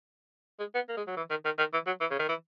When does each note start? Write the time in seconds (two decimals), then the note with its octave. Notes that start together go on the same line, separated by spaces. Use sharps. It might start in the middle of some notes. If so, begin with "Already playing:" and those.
0.59 G#3
0.74 B3
0.88 A#3
0.97 G#3
1.07 F#3
1.16 E3
1.30 D#3
1.45 D#3
1.58 D#3
1.73 E3
1.86 F#3
2.00 E3
2.11 C#3
2.19 D#3
2.29 E3